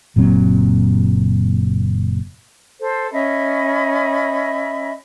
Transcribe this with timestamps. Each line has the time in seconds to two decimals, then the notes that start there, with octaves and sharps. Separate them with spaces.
0.16 F#1 A#2 F#3 C4
2.79 A4 C5
3.12 C#4 D#5 E5 B5